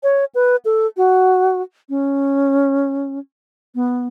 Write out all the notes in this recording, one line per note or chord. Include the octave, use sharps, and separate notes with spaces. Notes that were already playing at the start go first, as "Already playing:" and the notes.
C#5
B4
A4
F#4
C#4
B3